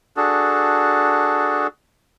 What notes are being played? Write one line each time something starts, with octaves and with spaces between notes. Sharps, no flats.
D4 F#4 G#4 A4